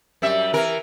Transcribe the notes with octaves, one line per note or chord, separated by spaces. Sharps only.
F#2 G3 E5
E3 A#4